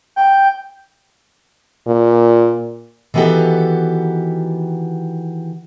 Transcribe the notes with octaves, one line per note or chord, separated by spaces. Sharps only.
G5
A#2
D#3 E3 B3 F#4 G4 A4